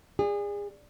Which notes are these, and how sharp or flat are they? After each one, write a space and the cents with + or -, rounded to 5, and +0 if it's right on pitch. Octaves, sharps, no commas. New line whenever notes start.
G#4 -30 D5 +0